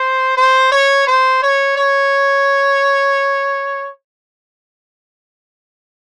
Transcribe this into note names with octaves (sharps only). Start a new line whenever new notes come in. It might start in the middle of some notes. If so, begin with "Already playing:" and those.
Already playing: C5
C5
C#5
C5
C#5
C#5